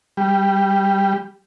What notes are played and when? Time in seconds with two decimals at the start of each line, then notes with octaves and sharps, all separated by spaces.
0.17 G3